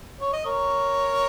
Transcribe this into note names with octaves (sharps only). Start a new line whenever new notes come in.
C#5
D#5
A#4 C#5